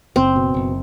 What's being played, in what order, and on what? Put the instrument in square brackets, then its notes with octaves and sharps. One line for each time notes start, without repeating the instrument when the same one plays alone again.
[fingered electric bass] F#1 [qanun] C4
[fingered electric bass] B2
F#1